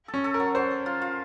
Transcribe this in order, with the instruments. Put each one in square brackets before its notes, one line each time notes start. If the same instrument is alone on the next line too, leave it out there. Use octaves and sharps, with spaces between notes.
[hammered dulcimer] A4
[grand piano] C#4
[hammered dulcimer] A4
[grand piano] A#4
[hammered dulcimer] F#3
[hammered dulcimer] F#3 [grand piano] C5
[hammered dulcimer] A4
F4
F4